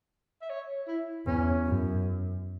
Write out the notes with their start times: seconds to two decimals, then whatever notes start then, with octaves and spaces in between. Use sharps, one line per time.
0.42 E5
0.50 C#5
0.88 E4
1.26 E2 C#4
1.66 F#2